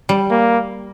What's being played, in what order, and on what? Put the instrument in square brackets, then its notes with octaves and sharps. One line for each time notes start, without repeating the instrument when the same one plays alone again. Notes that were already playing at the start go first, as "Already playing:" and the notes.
[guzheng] G3
[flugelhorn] A#3